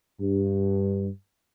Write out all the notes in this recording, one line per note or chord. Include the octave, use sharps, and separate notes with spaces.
G2